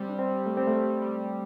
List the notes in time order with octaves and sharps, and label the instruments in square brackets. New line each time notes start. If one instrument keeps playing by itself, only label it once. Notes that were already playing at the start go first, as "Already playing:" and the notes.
Already playing: [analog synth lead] G3 [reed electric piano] C4
[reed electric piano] D4
C4
A3
C4
A3
[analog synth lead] G3